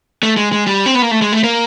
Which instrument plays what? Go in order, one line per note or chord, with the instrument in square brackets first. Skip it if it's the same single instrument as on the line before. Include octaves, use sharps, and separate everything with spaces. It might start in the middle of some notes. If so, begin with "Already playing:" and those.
[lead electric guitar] A3
G#3
G#3
G3
C4
B3
A#3
A3
G#3
A3
A#3